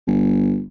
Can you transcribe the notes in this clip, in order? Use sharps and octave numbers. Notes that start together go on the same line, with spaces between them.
G1